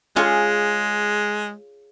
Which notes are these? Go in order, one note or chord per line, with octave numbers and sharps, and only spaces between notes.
G#3 F4 G#4 C#5